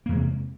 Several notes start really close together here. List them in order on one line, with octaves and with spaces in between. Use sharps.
A#3 E2 G#3 C3